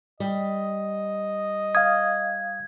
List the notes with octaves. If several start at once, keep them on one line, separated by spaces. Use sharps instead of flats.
G3 D#5
F5 D#6 G#6